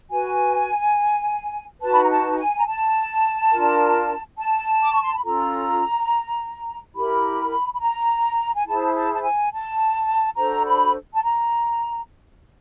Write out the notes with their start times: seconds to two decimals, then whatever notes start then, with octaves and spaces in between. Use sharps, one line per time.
0.10 F#4 B4 G#5
1.81 D#4 F#4 B4 A5
1.93 B5
2.02 A#5
2.10 A5
2.38 G#5
2.58 A#5
2.67 A5
3.52 D4 F4 A#4
4.38 A5
4.83 D6
4.93 C#6
5.03 C6
5.14 B5
5.24 C#4 F4 A4 A#5
6.95 E4 G4 A#4 B5
7.73 B5
7.80 A#5
8.55 G#5
8.66 E4 G#4 C5 A5
8.94 A5
9.14 A5
9.23 G#5
9.52 A5
10.37 D4 F#4 A4 C5 A#5
10.66 B5
11.14 A5
11.23 A#5